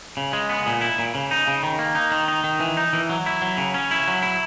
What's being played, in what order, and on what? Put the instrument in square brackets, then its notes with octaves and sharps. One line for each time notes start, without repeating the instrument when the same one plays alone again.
[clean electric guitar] C#3
G#3
B3
A#2
E4
A#2
C#3
D#4
C#3
D#3
A#3
D#4
D#3
D#4
D#3
E3
D#4
E3
F#3
E4
F#3
C#3
C#4
E4
F#3
E4